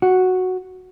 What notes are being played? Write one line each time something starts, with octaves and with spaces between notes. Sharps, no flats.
F#4